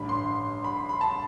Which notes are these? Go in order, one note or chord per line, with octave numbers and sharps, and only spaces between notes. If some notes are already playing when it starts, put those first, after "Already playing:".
Already playing: A1 G2 D3 B5
C6
B5
C6
B5
A5